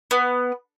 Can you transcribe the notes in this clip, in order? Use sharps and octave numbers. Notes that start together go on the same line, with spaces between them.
B3